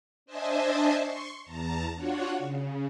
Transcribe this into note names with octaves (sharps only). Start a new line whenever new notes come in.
D4 C5 D#5 E5 G#5 A5
C6 C#6
E2 A5 A#5
D4 F4 F#4 C#5 F#5
C#3